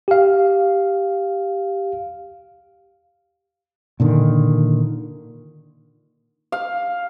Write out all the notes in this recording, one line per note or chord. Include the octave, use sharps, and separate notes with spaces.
G4 F5
A#2 D3 D#3
F5